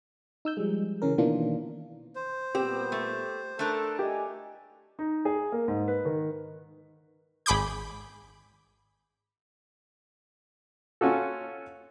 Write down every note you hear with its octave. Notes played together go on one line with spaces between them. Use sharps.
D#4 E6 G6
F3 G3 G#3
C#3 E3 C#4 A#4
B2 D#3 E3 A#3 D4 F4
C5
A#2 G3 B3 C4 G4
A3
A3 D4 A4 A#4
G4 D#5 E5 G#5
D#4
G#4
A#3
G#2
B4
D#3
G#1 G#4 B5 D6 G6
C#4 F4 F#4 A4